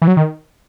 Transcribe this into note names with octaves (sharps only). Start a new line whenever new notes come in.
E3
F#3
D#3